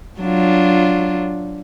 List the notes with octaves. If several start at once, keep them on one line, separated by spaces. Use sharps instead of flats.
F#3 D4 F4